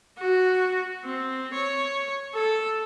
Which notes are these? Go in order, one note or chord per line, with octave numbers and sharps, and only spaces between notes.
F#4
C4
C#5
A4